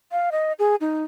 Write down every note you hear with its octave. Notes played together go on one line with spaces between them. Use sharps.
F5
D#5
G#4
D#4